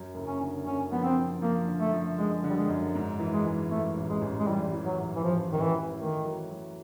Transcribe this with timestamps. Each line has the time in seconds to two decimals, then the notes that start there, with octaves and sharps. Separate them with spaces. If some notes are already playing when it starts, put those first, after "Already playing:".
Already playing: F#2
0.15 F#1
0.27 C#4
0.41 D3
0.66 F#1 C#4
0.92 F3 B3
1.04 C4
1.17 F3
1.42 F3 A#3
1.67 D3
1.80 A3
1.93 F3
2.18 D3 G#3
2.44 D3
2.50 G3
2.57 G#3
2.69 F#2
2.95 G#2
3.19 E3
3.33 G#3
3.45 E3
3.70 G#2 A3
3.97 A1
4.09 G#3
4.21 A1
4.40 G#3
4.47 E3 G3
4.73 E3
4.86 F#3
4.99 A1
5.16 E3
5.23 A1 F3
5.48 A1 D#3
5.62 E3
5.74 E3
5.99 D#3 A3
6.25 F#3
6.50 F#3